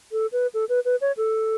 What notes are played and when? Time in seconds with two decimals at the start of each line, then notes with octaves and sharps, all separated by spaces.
0.12 A4
0.32 B4
0.54 A4
0.69 B4
0.85 B4
1.01 C#5
1.17 A4